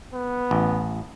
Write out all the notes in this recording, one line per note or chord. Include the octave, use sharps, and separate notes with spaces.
B3
A1